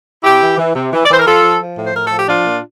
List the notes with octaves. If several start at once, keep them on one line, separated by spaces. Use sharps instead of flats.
C3 E4 G4
E3
E3
C3
E3
D5
E3 C5
A#4
F3 F4 A4
F3
F3
A2
C5
A2 A#4
A4
F3
G4
F3 D4 F4
A#2